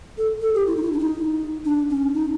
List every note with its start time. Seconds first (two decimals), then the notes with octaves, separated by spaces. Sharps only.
0.18 A4
0.42 A4
0.55 G4
0.67 E4
0.77 D#4
0.83 E4
0.93 D4
0.99 D#4
1.65 D4
1.90 C#4
2.14 D#4